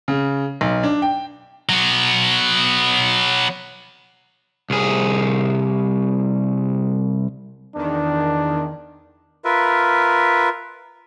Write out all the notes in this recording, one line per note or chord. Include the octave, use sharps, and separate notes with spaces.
C#3
B1
D4
G5
F#3 B3
C2 G#4
E2 D#3 D4
F4 A#4 B4 E5